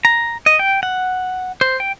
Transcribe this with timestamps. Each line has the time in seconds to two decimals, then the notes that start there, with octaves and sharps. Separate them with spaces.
0.05 A#5
0.46 D#5
0.59 G5
0.83 F#5
1.61 C5
1.80 G5